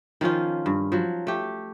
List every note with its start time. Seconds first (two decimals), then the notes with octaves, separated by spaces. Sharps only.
0.21 D#3 F3 C#4 F4
0.66 G2
0.92 F3 F#3
1.27 A3 G4